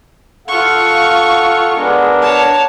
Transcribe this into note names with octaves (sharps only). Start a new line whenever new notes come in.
F4 A4 F5 F#5 C#6
G#3 B3 D4 A#4
C#5 A5